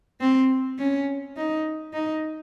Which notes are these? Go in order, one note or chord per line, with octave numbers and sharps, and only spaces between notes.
C4
C#4
D#4
D#4